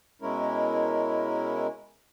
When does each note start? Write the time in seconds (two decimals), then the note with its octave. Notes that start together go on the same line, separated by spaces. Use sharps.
0.22 B2 G#3 C#4 E4 A#4